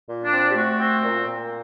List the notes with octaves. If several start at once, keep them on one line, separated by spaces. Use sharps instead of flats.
A#2
D4
C4
G4
A3 F#4
C4
A#2
A#2